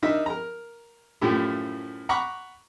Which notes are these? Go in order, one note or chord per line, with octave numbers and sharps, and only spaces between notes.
D4 D#4 A#4 D#5 E5
A#4 A#5
F#2 A2 F3 A3 E4 G4
F#5 A#5 B5 C#6 D6